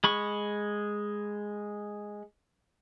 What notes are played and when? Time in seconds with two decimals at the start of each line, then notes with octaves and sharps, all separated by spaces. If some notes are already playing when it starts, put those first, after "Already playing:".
0.04 G#3 B5 C#6